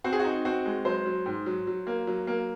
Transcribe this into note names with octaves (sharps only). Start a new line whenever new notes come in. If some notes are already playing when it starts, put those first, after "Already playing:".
C4 F#4
G#4
D#4 F#4
C4 F#4
G#3
F#3 C5
F#3
G#2
F#3
F#3
A#3
F#3
A#3